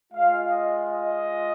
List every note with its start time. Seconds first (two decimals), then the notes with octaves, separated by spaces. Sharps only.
0.12 G#3 F4 F5
0.50 D#5
0.88 D#5